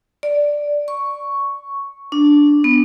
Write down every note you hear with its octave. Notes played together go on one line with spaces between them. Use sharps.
D5
C#6
D4
B3